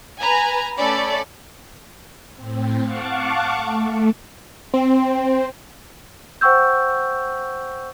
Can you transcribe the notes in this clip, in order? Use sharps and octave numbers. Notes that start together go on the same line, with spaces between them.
B4 G#5 A#5
A3 C#4 A4 D5 B5
A2 C4
F5 F#5 A5 C#6 D6
A3
C4
C5 F#5 G5 C#6 E6 G6